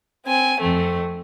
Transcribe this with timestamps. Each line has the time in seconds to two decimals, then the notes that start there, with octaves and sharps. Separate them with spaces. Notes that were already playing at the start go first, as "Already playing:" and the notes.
0.25 C4 G#5
0.60 F2 A3 C4